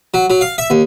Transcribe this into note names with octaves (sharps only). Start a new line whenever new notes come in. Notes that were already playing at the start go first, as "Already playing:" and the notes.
F#3
F#3
F5
E5
D#2